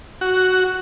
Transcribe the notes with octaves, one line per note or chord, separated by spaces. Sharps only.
F#4